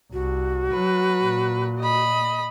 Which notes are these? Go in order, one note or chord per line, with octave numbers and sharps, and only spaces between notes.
C2 F#4
F#3 B4
A#2
D#5 B5